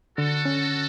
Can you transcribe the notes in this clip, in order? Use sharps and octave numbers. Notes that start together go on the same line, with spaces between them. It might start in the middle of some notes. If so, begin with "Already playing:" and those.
D3 F#4 A4
C#4